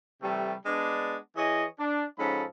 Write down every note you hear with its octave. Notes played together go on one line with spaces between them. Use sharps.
C3 E3 G3 A3
G#3 B3 D4
E3 G#4 C#5 D#5
D4
G#2 F3 C#4 A4 B5